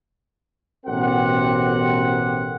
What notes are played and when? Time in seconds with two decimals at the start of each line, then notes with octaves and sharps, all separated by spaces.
0.86 A1 B2 C4 G4 A#4 F#5